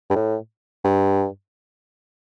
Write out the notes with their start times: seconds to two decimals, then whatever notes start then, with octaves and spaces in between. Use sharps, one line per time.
0.10 G2
0.15 A2
0.85 G2